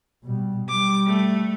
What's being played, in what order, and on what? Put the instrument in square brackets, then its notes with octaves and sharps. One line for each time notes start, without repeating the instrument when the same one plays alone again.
[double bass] B2 G3
[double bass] G3 [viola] D6
[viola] A3